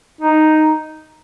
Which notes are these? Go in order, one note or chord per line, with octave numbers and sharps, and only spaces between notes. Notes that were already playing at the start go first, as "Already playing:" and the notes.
D#4